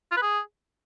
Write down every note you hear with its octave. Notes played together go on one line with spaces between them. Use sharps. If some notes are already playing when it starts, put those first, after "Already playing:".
F4
B4
G#4